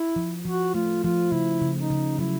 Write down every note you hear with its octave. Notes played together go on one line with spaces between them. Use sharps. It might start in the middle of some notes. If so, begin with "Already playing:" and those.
Already playing: E4
F3
F3 F#4
A3 F4
F3 F4
C#3 E4
C#3
D#4
C#3
F#3 E4